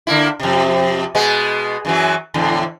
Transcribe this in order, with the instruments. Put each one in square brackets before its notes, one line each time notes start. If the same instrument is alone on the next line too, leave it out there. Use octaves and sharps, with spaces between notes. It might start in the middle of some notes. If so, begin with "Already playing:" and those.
[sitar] D3 A#3 E4
F2 C3
B2 G#3 B3
F#2 E3 F#3
E2 A2 D3